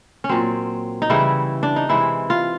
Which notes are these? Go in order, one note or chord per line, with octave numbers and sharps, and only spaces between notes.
C#4
A#2 F#3 C4
D#4
C#3 E3 G3 E4
D4
D#4
C3 E3 G#3 E4
F4